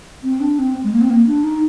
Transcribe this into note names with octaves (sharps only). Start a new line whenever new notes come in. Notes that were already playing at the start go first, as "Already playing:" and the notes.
C4
D4
C4
G#3
A#3
C4
A#3
D4
D#4